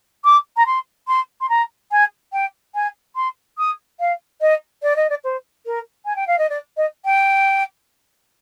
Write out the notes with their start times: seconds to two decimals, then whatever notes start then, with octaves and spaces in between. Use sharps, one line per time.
0.24 D6
0.57 A#5
0.66 C6
1.08 C6
1.41 C6
1.49 A#5
1.91 G#5
2.33 G5
2.75 G#5
3.16 C6
3.58 D#6
4.00 F5
4.41 D#5
4.83 D5
4.96 D#5
5.10 D5
5.24 C5
5.66 A#4
6.05 G#5
6.16 G5
6.27 F5
6.38 D#5
6.49 D5
6.77 D#5
7.05 G5